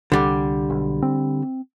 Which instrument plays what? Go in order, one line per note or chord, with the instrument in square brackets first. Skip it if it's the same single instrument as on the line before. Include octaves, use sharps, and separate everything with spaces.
[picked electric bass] C2 [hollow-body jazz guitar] D3 G3
[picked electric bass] B1
C4